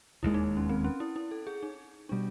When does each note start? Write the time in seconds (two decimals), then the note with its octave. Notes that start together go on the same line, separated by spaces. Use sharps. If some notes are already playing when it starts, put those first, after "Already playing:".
0.22 E1 D#2 D#3 G#3 E4
0.34 D#4
0.57 C#4
0.69 C4
0.84 C#4
1.00 E4
1.16 E4
1.31 A4
1.47 G#4
1.63 D#4
2.09 B2 G3 D4